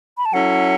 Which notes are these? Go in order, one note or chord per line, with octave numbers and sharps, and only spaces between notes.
B5
A5
F#3 C#4 E4 A4 F#5